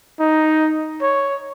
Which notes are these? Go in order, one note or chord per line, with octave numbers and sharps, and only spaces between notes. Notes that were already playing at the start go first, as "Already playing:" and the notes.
D#4
C#5